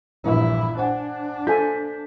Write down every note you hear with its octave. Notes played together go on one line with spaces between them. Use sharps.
A#1 G2 A#2 E3 E4
D4 C5 F#5 G#5
F4 A4 G#5 G6 B6